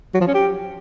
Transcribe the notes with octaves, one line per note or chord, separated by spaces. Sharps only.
F#3
F3
C#4
G4